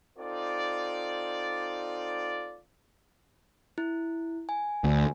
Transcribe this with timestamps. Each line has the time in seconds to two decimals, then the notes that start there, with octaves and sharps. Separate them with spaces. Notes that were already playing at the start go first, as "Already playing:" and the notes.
0.18 C4 D#4 F4 A4 D5
3.78 E4
4.49 G#5
4.84 D2